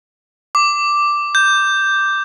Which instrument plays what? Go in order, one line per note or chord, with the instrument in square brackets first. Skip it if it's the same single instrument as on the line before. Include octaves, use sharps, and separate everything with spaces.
[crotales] D6
G6